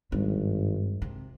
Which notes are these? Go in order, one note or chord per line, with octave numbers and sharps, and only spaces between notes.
G#1 G2
C3